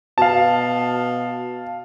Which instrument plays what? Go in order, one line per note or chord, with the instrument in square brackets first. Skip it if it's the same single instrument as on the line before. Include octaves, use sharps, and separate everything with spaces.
[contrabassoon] B2 [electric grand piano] F5 A5